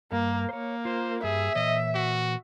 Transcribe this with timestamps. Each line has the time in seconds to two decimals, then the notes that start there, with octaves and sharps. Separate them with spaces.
0.12 G2 A#3
0.49 A#3 C5 C#5
0.85 F4 C5
1.23 G2 G3 G#4 E5
1.55 A#2 E3 C#5 D#5
1.95 F#4